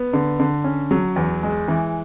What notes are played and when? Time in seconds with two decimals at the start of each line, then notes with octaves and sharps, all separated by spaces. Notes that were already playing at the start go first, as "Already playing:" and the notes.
Already playing: B3
0.13 D3
0.40 D3
0.64 C#4
0.91 F#3
1.16 E2
1.43 G#3
1.68 E3